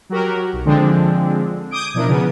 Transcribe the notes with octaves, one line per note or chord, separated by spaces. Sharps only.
F#3 F#4 G4 A#4
B1
D3 F3 G#3 C4 D4
D6 D#6 G6 G#6 D7
B2 F3 D4 E4 A#4
C#3 B3